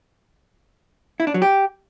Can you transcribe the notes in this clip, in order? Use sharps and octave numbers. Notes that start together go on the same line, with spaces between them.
E4
D4
F#3
G4